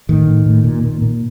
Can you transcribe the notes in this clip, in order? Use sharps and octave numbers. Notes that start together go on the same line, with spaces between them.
A2 D#3
A2
A2
A#2
A#2
A#2